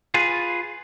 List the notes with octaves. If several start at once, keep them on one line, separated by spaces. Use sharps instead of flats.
F4 G#4 B4